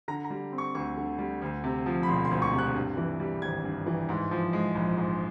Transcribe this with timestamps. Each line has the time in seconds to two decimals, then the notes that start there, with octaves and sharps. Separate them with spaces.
0.08 D3 A#5
0.25 A#5
0.30 G3
0.52 C4
0.58 C#6
0.75 D2 C#6
0.97 D3
1.19 G3
1.42 D2
1.64 C3
1.86 F3
2.03 B5
2.08 E1 C6
2.25 C6
2.31 D2
2.42 C#6
2.53 C3
2.58 F#6
2.76 G2
2.97 E3
3.20 G3
3.42 G#1 G#6
3.64 G2
3.86 E3
4.09 G#2
4.31 F3
4.53 G#3
4.75 A#1
4.97 G#2